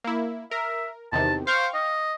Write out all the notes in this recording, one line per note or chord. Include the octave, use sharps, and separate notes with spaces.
A#3 E4
A#4 E5
E2 C3 D#3 A5
C5 F5 G5 C#6
D#5